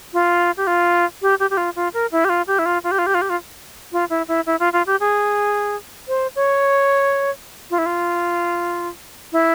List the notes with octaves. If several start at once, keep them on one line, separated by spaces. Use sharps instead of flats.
F4
G4
F4
G4
G4
G4
F4
F4
A#4
E4
G4
F4
G4
E4
F4
F4
G4
F4
G4
F4
G4
F4
F4
E4
E4
E4
F4
F4
G4
G#4
C5
C#5
F4
E4
F4
E4